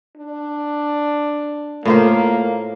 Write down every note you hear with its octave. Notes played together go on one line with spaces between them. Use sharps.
D4
A2 A#3 F4 C5